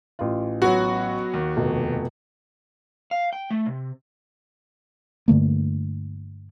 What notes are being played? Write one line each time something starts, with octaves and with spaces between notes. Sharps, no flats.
A1 F4
F#3 B3 F#4
D#2
F1 B2
F5
G5
A3
C3
G2 D3 A3 A#3